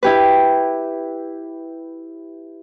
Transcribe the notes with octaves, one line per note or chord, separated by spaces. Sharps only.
E4 G4 B4